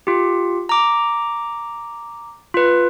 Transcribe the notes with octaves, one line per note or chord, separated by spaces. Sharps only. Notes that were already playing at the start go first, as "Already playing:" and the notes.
F4 G4
A#5 D6
F4 B4